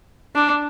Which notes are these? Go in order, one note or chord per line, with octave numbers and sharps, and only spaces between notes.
D4